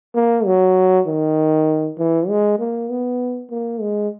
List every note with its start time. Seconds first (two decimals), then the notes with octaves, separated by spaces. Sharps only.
0.15 A#3
0.46 F#3
1.07 D#3
1.99 E3
2.29 G#3
2.59 A#3
2.90 B3
3.51 A#3
3.81 G#3